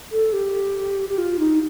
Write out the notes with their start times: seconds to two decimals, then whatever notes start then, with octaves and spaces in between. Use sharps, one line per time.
0.12 A4
0.33 G4
1.09 G4
1.18 F4
1.39 D#4